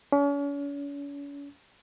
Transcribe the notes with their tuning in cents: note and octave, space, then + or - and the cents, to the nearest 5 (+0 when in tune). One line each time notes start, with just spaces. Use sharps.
C#4 +40